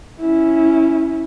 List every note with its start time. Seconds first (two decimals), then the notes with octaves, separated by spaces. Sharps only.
0.20 C#4 E4